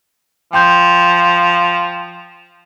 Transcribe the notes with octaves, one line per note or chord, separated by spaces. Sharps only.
F3 G5 C6 G6